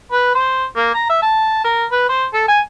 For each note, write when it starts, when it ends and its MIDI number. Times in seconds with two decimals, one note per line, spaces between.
0.12 0.33 71
0.35 0.64 72
0.76 0.90 58
0.94 1.09 82
1.10 1.18 76
1.22 1.63 81
1.64 1.85 70
1.91 2.06 71
2.09 2.25 72
2.33 2.44 69
2.48 2.60 80